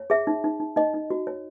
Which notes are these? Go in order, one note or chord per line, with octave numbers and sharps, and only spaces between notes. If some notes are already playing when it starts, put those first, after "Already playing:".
Already playing: C#5
G#4 E5
D#4
D#4
D#4
D#4 D#5
D#4
F#4
C#5